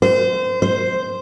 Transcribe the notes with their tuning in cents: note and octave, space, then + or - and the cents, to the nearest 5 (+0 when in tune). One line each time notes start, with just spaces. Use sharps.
C5 -30
C5 -5